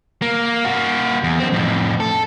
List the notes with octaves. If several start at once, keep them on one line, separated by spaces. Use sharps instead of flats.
A#3
A#3 F#4
E2
F#2 C4
F2 A2
A4